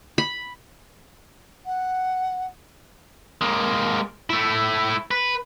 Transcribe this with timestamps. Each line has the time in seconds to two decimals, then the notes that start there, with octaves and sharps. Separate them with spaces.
0.18 B5
1.66 F#5
3.41 G#3 A#3
4.30 A3 E4
5.11 B4